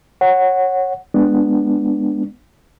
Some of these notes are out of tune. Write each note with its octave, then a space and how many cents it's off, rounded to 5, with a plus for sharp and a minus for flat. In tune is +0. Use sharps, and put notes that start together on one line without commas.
C#5 -15 F#5 +0
G#3 +0 B3 +0 D4 +10